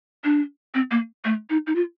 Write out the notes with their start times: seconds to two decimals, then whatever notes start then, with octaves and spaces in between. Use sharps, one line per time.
0.24 D4
0.74 C4
0.91 A#3
1.25 A3
1.50 D#4
1.67 D#4
1.76 F4